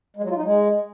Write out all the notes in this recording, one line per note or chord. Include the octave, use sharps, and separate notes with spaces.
G#3
F#3
F4
D#4
G#3